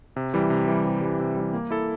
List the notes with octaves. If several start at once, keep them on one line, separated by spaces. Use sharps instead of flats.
C3
E3 G3
C3
E3 G3
C3
E3 G3
C3
E3 G3
A#3
E4 A4